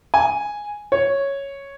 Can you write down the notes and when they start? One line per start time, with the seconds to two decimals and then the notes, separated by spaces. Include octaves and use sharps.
0.14 G#5
0.92 C#5